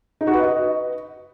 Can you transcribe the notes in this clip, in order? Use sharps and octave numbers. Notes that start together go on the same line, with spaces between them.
D#4
F#4
B4
D#5